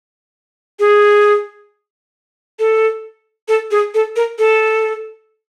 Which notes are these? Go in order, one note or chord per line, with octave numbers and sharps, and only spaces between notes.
G#4
A4
A4
G#4
A4
A#4
A4